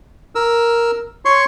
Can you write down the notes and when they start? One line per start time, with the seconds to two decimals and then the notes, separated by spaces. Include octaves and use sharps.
0.35 A#4 E6
1.25 C#5 C6 C#6